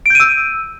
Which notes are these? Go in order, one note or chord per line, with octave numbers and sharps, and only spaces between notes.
E6 G6 D7 D#7